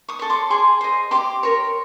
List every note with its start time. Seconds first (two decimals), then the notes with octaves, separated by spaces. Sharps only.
0.08 C#6 D#6
0.19 A4 C#5
0.30 C6 D6
0.50 G#4 C6 D6
0.81 C5 D#5
1.11 G4 C6 D6
1.43 A#4 C#5